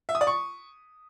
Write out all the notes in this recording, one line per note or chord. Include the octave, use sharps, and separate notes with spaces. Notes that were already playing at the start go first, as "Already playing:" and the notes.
E5
D#6
D5
C#6